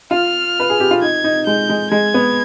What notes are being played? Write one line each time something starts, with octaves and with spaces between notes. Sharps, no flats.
F4 F6
B4
G#4
G4
F4
D#4 G#6
D#4
G#3 G6
G#3
G#3 G#6
B3